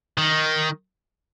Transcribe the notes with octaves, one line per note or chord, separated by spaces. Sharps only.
D#3